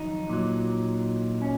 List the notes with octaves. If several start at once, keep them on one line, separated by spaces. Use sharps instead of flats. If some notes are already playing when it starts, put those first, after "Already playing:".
Already playing: F2 D#3 F#3 D#4
A#2 F#3
C#4